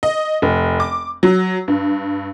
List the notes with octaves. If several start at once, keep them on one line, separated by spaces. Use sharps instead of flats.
D#5
F1
D6
F#3
G2